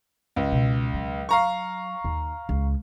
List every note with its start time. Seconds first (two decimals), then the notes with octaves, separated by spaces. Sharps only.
0.36 C#2
0.52 B2
0.94 F#3
1.29 F5 A#5 C#6
2.04 D#2
2.49 C#2